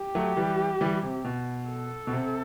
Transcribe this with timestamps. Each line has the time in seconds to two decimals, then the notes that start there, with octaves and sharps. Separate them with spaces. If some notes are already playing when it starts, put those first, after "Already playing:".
Already playing: G4
0.15 F#3 A3
0.37 E3 G3
0.81 E3 G3
1.03 C3
1.24 B2
1.68 A4
2.07 B2
2.12 C3